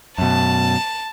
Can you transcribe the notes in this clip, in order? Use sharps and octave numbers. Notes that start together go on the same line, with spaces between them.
F#2 B2 A5